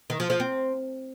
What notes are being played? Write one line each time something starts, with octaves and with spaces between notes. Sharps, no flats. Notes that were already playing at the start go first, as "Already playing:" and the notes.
D#3
F3
F3
C4